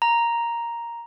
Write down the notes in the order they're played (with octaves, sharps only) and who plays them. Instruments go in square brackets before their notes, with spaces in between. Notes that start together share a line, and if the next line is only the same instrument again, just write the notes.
[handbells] A#5